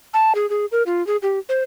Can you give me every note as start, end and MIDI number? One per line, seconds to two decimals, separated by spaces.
0.14 0.33 81
0.35 0.49 68
0.50 0.66 68
0.72 0.83 70
0.86 1.05 65
1.07 1.17 68
1.22 1.39 67
1.49 1.63 72